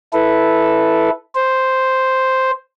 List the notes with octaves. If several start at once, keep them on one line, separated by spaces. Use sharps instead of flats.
E4 A4 B4
C5